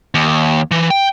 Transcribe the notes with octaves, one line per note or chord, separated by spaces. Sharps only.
D#2
E3
G5